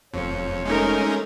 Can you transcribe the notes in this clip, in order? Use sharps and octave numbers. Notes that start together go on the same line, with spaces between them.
F1 F2 C#5
G#3 A3 C#4 D#4 A#4